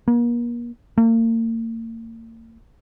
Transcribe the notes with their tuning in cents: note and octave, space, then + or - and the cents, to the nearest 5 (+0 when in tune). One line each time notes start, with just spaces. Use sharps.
A#3 +35
A#3 -40